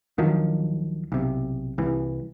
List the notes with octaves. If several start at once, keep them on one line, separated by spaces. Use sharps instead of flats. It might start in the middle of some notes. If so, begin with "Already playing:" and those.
D2 D#3 F3 F#3
B1 C3
C2 E3